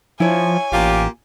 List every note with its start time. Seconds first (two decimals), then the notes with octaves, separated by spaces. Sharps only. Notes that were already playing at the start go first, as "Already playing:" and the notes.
0.20 F3 E4 C#5 G#5
0.72 A1 A#3 F4 G4